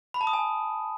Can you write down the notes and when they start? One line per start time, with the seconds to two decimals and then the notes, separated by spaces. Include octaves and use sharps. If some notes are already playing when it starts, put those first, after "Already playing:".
0.14 B5
0.21 A5
0.27 D#6
0.33 G#5